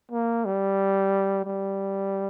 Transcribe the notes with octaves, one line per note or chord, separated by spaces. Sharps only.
A#3
G3
G3